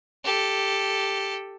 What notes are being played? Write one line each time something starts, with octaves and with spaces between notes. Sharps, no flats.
G4 A4